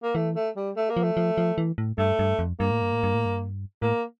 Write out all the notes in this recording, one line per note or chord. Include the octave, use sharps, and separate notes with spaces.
A#3
E3 A3
A3
G3
A3
A#3
F3
A3
F3
F3
E3
A2
G2 A3
G2
F2
G2 A#3
A2
G2
A2
G2
A2
G2
A2 A#3